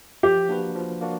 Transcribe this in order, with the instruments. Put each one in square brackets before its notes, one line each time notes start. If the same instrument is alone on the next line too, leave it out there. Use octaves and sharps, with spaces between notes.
[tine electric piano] F3 [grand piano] G4
[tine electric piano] A#3 D4 F#4 B4
F3
A#3 D4 F#4